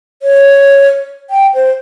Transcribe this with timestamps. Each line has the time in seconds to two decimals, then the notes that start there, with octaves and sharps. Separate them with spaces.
0.22 C#5
1.30 G5
1.55 C5